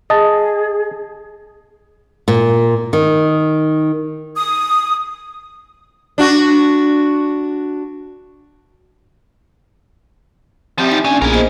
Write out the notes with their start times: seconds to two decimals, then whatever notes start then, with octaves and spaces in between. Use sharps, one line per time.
0.10 G#4 D#5 A5
2.28 A#2
2.93 D#3
4.36 D#6
6.18 D4 F#4
10.78 F3 G3 C4 G4 E5
10.92 D#4 G#5
11.04 A#2 C#4 D4 G#5
11.22 A#1 B3 E4 G#4 A#4
11.33 A#3 C5 D#5